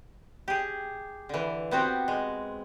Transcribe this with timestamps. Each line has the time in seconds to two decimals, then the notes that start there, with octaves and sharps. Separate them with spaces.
0.48 G4 G#4
1.29 D3 E3
1.71 B3 C4 F#4 G4
2.08 G#3